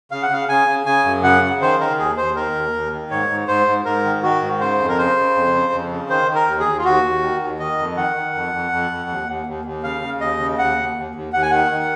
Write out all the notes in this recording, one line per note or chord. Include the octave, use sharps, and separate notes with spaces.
C#3 F5
F#5
C#3 F5
C#3 G#5
C#3
C#3 G#5
F#2
C#3 F#5
C#3
D#3 C5
D#3 A#4
D#2 G#4
D#2 C5
D#3 A#4
D#2
D#2
D#3
G#2 C#5
G#2
G#2 C5
G#2
G#2 A#4
D#3
D#3 F#4
G#2
C#3 C5
F2
A#4
C#3 C5
C#3
F2
C#3
F2
C#3
D#3 C5
D#3
A#4
D#2
G#4
D#2
F4
D#2 F#4
D#2
D#3
D#2
D#3 D#5
F2
D#3 F#5
D#3
F2
F2
F2
F2
D#2
D#2
D#2
D#2
C#3 F5
C#3
D#2 D#5
C#3
D#2 F#5
D#2
D#2
D#2
D#2 F#5
G#5
D#3 F#5
D#3